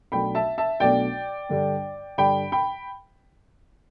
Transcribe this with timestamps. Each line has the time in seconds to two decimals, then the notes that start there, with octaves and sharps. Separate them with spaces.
0.12 B1 B2 A3 D4 G5 B5
0.35 E5 A5
0.58 E5 A5
0.80 B1 B2 A3 D4 D5 G5
1.49 G2 D3 G3 D4
2.18 G2 D3 G3 D4 G5 B5
2.52 G5 B5